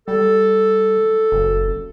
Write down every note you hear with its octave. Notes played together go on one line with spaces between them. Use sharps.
G3 A4
F#1